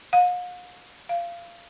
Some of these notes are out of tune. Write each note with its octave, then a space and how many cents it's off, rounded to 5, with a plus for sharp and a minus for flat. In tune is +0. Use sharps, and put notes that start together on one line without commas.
F5 +45
F5 -20